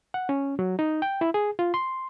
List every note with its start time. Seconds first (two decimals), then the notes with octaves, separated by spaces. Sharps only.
0.14 F#5
0.29 C#4
0.59 F#3
0.79 D#4
1.02 G5
1.21 E4
1.34 G#4
1.59 F4
1.74 C6